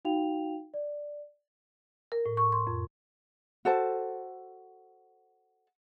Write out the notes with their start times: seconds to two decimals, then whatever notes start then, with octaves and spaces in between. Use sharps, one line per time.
0.05 D#4 F#4 F5 G5 F7
0.74 D5
2.12 A#4
2.26 A2
2.37 C#6
2.52 C6
2.67 F2
3.65 F#4 A4 C5 A5